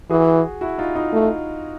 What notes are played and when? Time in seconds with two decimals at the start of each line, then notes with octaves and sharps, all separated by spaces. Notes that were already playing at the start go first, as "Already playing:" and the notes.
0.10 E3 F#4 G#4
0.61 E4 F#4
0.78 D#4 F4
0.96 D#4 F4
1.13 A3